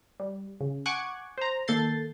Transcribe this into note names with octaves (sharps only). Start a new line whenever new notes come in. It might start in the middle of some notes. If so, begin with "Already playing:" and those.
G3
C#3
F#5 G#5 C#6 D6 F#6 G#6
C5 A#5
D#3 A#3 A4 G6 A6 C7